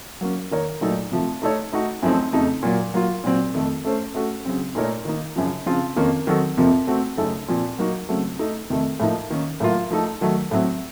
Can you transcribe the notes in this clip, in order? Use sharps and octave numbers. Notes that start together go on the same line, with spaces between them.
F#3 A#3 C#4
D#3 A#3 D#4 A#4 C#5
A#2 F#3 A3 D#4 A4
C3 F3 A3
A3 D#4 A4 C#5
A3 D#4 F#4
F#2 F3 A3 C4 D#4
F2 C#3 A3 D#4
A#2 F#3 A#3
F#3 A#3 F4
A#2 F#3 C4
F2 D#3 A3
A3 C#4 A4 C5
A3 C#4 F#4 A4
C#3 F#3 C4
A#2 A3 D#4 A#4 C#5
D#3 A#3 D#4
F#2 C#3 F3
C#3 F3 C4 F4
F2 D#3 A#3 C#4
D#3 F#3 C4 F#4 A4
F2 C3 F3 A#3
A3 C4 F#4
F#2 C#3 A3 D#4 A4
A#2 F3 C4
F#3 A#3 D#4 F#4
C#3 F#3 A3 C4
A3 D#4 A4
F2 C3 D#3 A3
A2 F3 A#3 D#4
D#3 A#3 C#4
A2 F#3 A#3 F4
F3 A3 D#4 A4
D#3 F#3 A3
A2 F#3 C4